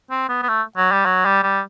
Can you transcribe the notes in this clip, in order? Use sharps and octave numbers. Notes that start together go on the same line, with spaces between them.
C4
B3
B3
A3
F#3
G3
F#3
G3
G3